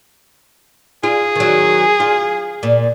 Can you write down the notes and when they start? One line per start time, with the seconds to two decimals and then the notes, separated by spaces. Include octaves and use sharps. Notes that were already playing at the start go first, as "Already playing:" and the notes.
1.03 F4 G#4
1.36 D#3 F#3
2.00 F4
2.63 A#2